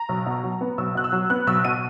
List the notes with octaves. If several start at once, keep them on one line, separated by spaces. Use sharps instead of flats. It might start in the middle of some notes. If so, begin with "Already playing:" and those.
Already playing: A#5
B1
B2
F#3
B3
B1 E6
B2 F#6
E6
F#3
B3 F#6
B1 E6
B2 D#7